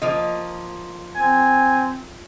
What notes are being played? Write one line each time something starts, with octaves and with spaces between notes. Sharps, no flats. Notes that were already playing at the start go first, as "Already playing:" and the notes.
F3 A#3 D#5
C4 G#5